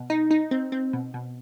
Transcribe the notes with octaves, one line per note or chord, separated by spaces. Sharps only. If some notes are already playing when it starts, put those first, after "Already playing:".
Already playing: B2
D#4
D#4
C4
C4
B2
B2